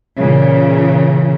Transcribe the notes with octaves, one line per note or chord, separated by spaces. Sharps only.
A#2 C#3 E3